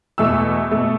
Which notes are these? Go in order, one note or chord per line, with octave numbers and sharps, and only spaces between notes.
E2 B2 A3 E6
B2 A3